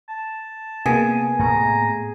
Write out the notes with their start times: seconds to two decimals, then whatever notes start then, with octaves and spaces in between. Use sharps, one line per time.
0.09 A5
0.86 C3 A#3 B3 G#4
1.39 A2 A3 A#5